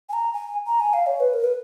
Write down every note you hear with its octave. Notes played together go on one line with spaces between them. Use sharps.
G#5
A#5
G#5
A#5
G#5
F5
C#5
B4
A#4
B4